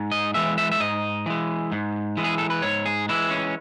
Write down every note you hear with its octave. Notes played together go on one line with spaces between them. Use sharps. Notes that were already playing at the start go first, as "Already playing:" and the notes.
Already playing: G#2
D#5
E3 G#3 E5
E5
E5
G#2 D#5
E3 G#3
G#2
E3 G#3
G#4
A4
B4
G#2 C#5
G#4
E3 G#3 E4
C#4